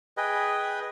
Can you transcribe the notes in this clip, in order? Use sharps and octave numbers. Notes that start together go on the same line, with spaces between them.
G#4 B4 D#5 G5